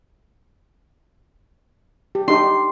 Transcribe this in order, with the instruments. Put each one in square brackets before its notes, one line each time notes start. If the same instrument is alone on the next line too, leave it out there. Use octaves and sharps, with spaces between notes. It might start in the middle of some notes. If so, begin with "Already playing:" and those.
[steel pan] G4
[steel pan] D4 D#4 G4 [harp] C6